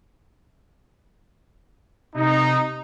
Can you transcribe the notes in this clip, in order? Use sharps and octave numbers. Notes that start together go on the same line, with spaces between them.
C3 D#4